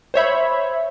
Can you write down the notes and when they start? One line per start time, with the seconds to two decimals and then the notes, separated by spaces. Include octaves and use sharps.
0.14 C5 C#5 E5 B5